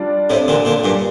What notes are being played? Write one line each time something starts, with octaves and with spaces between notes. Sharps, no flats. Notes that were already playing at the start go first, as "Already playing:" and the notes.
Already playing: G3 D4 F4 D5
A2 C3
A#2 D3
A#2 D3
G2 A#2